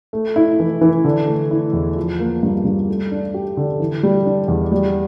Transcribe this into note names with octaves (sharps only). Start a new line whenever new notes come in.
A3
E4
E3
E3
D3
A3
E4
E2
F3
A#3
G2
G2
A3
D4
G4
D3
E3
G3
D4
E2
G3